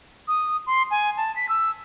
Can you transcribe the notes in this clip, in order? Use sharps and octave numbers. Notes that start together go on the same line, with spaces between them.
D#6
C6
G#5
A5
B6
E6